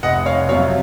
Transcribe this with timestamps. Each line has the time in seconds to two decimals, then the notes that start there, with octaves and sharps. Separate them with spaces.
0.03 F1 D#5 F#5
0.26 C#5 F5
0.49 F2 C3 F#3 C#5 F5